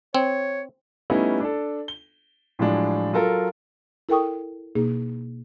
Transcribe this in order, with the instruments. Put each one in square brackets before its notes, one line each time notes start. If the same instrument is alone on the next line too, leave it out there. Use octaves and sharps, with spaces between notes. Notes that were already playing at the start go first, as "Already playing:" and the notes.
[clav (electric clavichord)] C4 [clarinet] C#5
[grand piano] G3 A3 B3 C#4 D#4 E4
D4 A4
G7
A2 F3 F#3 G#3 D4
F#3 F4 A4 A#4
[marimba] E4 A4 A#4 G5 C#6 D#6
B2 A#3 D#4 G#4